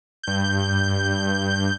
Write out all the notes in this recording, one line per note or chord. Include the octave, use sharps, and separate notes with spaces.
G2 G6